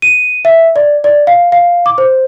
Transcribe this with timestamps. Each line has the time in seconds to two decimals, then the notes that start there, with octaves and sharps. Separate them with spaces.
0.02 D#7
0.45 E5
0.76 D5
1.04 D5
1.27 F5
1.52 F5
1.86 D6
1.98 C5